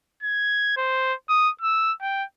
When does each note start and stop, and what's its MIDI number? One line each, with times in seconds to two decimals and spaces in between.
0.23 0.76 92
0.77 1.13 72
1.29 1.49 87
1.61 1.92 88
2.02 2.24 79